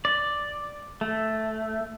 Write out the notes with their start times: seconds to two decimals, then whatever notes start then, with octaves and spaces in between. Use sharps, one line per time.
0.05 D5
1.01 A3